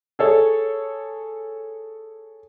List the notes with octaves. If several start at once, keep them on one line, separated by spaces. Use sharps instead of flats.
G#4 A4 C#5